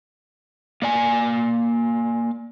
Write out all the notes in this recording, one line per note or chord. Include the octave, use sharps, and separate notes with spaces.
A#3 D5 G#5